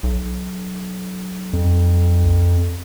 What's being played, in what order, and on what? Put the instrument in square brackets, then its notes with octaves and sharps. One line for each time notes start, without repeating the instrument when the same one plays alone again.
[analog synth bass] B1
[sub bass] F2